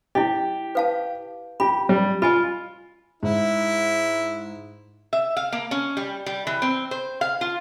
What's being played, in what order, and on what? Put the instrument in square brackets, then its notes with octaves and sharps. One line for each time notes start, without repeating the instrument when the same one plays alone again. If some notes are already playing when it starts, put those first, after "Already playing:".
[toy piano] E4 D#5 [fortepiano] G4
[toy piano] B4 F5 A5
[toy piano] F4 B5 [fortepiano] G4
[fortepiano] G3
[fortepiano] F4 [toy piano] D#5 G#5 B5
[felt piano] G#2 [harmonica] E4
[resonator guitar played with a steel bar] E5
F5
A#3
C#4
G3
G3
E3
C4
C5
F5
F4